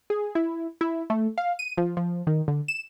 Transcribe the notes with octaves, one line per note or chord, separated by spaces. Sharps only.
G#4
E4
E4
A3
F5
D#7
F3
F3
D#3
D3
E7